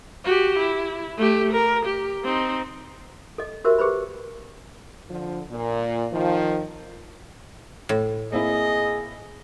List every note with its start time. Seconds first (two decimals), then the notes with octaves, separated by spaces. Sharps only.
0.24 F#4 G4
0.59 E4
1.17 A3 G4
1.53 A#4
1.85 G4
2.24 C4 D#4
3.38 A4 D#5
3.64 F#4 G4 A#4 C5 E5
3.78 G4 G#4 B4 C5 B5
5.10 D3 F3
5.50 A#2
6.12 D#3 F3
7.89 A2
8.32 A#3 C4 E4 G#4 D#5